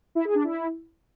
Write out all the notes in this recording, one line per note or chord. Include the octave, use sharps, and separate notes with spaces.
E4
G#4
D4
E4